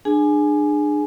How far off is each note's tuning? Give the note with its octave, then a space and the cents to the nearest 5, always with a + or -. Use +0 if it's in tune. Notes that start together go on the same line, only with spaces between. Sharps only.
D4 +30 G#4 +0 G#5 +10